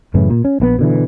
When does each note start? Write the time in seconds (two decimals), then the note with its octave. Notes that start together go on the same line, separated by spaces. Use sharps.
0.14 F#2 A2 C#3 E3
0.30 A#2
0.45 C#4
0.60 A#1 E3 B3
0.79 B2 D3 E3